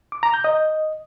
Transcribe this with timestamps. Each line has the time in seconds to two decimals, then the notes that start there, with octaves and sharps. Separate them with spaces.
0.12 D6
0.23 A#5
0.34 G6
0.44 D#5